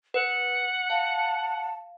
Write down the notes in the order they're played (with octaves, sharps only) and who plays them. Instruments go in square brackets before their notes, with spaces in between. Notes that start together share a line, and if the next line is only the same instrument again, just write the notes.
[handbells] B4 [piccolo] F#5
[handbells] F5 [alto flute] A5